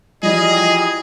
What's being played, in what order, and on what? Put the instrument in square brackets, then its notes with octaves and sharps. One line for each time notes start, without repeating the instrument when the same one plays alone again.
[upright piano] E3 F3 [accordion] G3 D#5 [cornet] G#4